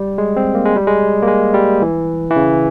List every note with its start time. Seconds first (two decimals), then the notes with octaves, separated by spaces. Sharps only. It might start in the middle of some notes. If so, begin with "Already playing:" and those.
Already playing: G3
0.18 G#3
0.36 C4
0.55 A#3
0.65 G#3
0.76 G3
0.87 G#3
1.23 A#3
1.28 G#3
1.54 G3
1.82 E3
2.30 E3
2.36 C#3